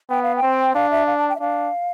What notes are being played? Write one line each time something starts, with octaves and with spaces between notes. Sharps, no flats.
B3 G5
F5
G5
C4
D4 F5
E5
F5
A5
G5
E5
D4 F5